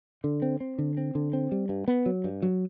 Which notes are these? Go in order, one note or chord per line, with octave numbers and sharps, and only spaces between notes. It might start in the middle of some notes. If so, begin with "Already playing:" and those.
D3
C4
C4
D3
C4
D3
C4
G3
G2
B3
F#3
G2
F#3